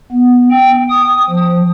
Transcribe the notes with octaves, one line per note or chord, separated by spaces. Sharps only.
B3
G5
D#6
F3